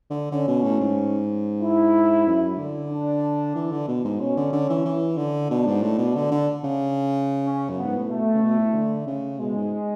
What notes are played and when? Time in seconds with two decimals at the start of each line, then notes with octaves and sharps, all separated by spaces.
0.10 D3
0.31 D3 C#4
0.48 B2
0.63 A2
0.80 G#2
1.62 E4
2.27 F#2
2.58 D3
2.90 D4
3.55 E3
3.72 D3
3.88 B2
4.05 G#2
4.20 B2 C#4
4.37 D3
4.53 D3
4.70 E3
4.85 E3
5.17 D3
5.50 B2 D4
5.67 G#2
5.83 A2
5.98 B2
6.16 D3
6.31 D3
6.64 C#3
7.45 C#4
7.69 F#2
7.77 B3
7.83 G#2
7.97 A2
8.10 B2 A3
8.34 C#3
8.42 B2
8.58 A2
8.74 D3
9.07 C#3
9.39 B2 G#3
9.56 G#2